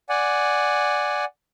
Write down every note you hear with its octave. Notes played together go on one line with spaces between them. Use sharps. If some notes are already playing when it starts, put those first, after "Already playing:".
D5 F#5 G#5